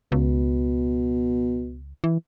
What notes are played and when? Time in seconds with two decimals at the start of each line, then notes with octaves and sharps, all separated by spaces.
0.12 C#2 B2
2.04 E3